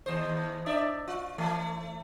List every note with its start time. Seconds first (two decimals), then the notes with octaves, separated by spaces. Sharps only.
0.06 D#2 C5
0.66 D4 D5 E5
1.08 F4
1.38 E3 A3